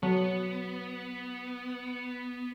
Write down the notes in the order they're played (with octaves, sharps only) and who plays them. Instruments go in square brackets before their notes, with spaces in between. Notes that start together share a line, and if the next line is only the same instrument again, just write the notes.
[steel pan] F#3 [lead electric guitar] B3